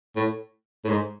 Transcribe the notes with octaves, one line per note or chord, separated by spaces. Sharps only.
A2
A2
G#2